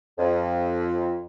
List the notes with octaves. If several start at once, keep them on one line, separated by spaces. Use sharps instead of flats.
F2